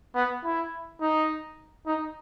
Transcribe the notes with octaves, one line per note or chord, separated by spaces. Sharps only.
B3
E4
D#4
D#4